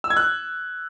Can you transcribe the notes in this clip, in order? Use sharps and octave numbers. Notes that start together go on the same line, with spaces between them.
E6
G#6
F#6